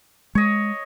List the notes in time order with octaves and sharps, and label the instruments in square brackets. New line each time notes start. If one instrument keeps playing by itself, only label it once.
[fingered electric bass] G#3 [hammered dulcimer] C#5 D#5